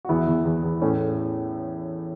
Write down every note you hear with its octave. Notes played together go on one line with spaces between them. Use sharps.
F#4
E2 B3 E4
E2
E2
E2
A2 A3 C#4